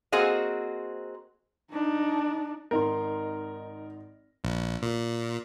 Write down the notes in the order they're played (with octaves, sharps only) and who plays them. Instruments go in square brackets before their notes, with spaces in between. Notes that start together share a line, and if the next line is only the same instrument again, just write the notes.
[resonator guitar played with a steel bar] A#3 C4 F#4 G#4 C5 D#5
[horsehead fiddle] D4 D#4
[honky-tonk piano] G#1 D#4 C6 [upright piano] A#4
[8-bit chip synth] A#1
A#2